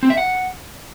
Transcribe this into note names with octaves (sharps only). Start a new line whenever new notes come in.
C4
E5
F#5